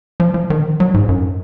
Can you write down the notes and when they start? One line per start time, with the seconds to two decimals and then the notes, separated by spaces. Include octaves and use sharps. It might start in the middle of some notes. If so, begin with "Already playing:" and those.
0.20 F3
0.34 F3
0.50 D#3
0.80 F#3
0.94 G#2
1.09 F#2